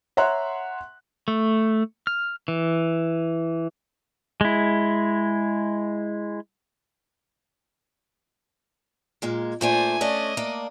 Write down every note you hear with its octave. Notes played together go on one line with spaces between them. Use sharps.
C#5 E5 F#5 A#5 C6 F#6
A3
F6
E3
G#3 E4
A#2 G#3 A#3
A#2 A3 D4 C5 G#5
A3 C#4 D4 D#5
A#3 D4